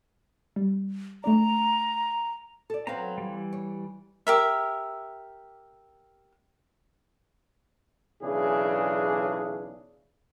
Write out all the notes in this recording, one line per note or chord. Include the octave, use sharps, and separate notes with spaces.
G3
A3 D4 D5 A#5
A4 D5
F#3 C4 B4 F5 A#5
E3 G3
C#5
G4 A#4 E5
B1 C#3 E3 D4 G#4